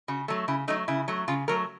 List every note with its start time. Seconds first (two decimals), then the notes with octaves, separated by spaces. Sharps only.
0.08 C#3 F#4
0.28 F#3 A3
0.48 C#3 E4
0.68 F#3 A3 D#4
0.88 C#3 E4
1.08 F#3 A3
1.28 C#3 F4
1.48 F#3 A3 A#4